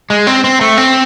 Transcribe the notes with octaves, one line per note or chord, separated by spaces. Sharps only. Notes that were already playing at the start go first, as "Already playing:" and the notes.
G#3
C4
C4
A3
C4